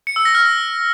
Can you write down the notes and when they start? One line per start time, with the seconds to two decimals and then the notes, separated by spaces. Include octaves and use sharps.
0.07 C#7
0.16 E6
0.25 A#6
0.35 F6